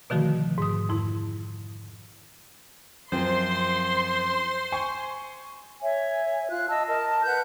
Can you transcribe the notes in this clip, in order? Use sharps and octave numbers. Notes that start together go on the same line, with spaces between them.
B2 D3 D#3 F3 A3 F#4
G#2 D#6
F2 G#2 E4
F#2 F3 C4 C5 C6
G#5 C#6
C#5 E5 G#5
F4 F#6
D#5 A5 E6
A#4 D#5 A5
B4 F#5 F#6 G6